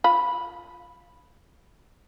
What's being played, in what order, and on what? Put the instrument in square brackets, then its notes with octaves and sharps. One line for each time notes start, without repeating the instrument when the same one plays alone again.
[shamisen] F4 B5